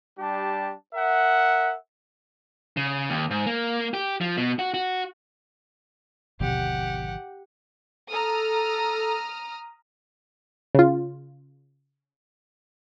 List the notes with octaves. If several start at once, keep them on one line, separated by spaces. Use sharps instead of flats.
G3 D4 G4 A5
A#4 E5 F#5
C#3
D#2
G#2
A#3
G4
F3
B2
F#4
F#4
G#1 D#2 B2 D3 F3 G4 F#5
A4 A#5 D#6 F6
C#3 F4